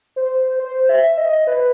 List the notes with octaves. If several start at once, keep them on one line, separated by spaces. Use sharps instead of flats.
C5
C5
E5
D#5
B4